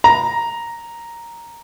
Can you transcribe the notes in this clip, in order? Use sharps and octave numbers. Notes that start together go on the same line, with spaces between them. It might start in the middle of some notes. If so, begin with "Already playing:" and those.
A#5